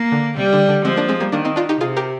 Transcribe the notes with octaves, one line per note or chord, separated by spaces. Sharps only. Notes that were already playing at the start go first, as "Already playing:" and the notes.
Already playing: A#3
D3
C3 G3
D3
D3
F3 G#3 C4
A#3 D4
G#3 C4
G3 A#3
D#3 A#3 D4
C4 D#4
D4 F4
D#4 G4
C3 F4 G#4
G4 A#4